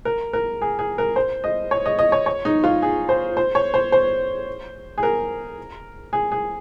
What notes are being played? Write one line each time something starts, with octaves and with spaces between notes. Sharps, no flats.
A#4
A#4
G#4
G#4
A#4
C5
D#5
C#5
D#5
D#5
C#5
C#5
D#4
F4
G#4
C5
C5
C#5
C5
C5
G#4
A#4
G#4
G#4